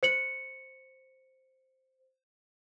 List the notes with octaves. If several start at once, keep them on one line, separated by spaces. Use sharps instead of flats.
C5 C#7 F#7